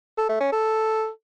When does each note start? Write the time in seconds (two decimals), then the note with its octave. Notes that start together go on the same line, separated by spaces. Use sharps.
0.18 A4
0.29 A3
0.41 C#4
0.52 A4